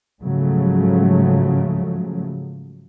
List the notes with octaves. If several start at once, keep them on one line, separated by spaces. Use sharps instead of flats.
G#2 C#3 F3 F#3 A3